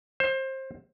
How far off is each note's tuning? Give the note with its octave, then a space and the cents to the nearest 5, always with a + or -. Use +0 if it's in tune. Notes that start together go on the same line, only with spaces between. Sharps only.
C5 +25